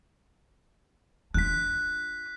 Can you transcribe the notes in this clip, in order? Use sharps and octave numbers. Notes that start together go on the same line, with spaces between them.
D4 F4 F#6 B6